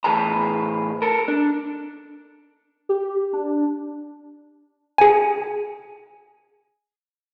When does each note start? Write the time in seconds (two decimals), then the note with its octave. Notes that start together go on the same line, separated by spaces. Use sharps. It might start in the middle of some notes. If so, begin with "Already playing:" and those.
0.04 A2 E3 G#4 B4 A5 A#5
1.02 A4 A#4
1.28 D4
2.89 G4
3.33 D4
4.98 G#4 G#5